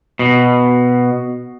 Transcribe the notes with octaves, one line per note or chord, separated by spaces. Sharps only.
B2